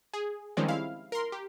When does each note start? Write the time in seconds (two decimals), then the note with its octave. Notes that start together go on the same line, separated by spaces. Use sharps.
0.13 G#4
0.57 D#3 F3 G3 G#3 C4 C#4
0.68 E4 F5
1.12 A#4 C6
1.32 G4